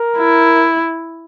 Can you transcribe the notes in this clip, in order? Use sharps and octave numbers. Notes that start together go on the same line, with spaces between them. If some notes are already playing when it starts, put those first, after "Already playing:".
Already playing: A#4
E4